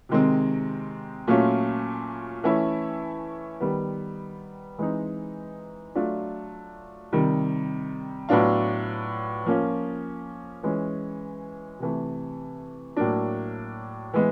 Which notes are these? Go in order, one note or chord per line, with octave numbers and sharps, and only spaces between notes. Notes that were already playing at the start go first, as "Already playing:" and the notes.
C3 D#3 G#3 C4
A#2 F#3 A3 C#4 F4
E3 A3 C#4 E4
D#3 G3 B3
E3 G#3 C4 D#4
F#3 A3 D4 F4
C3 D#3 G3
A2 F#3 B3 D4 F4
F3 A#3 C#4 F4
E3 G#3 C#4
C3 E3 A3
A2 F#3 A#3 D4
E3 G#3 B3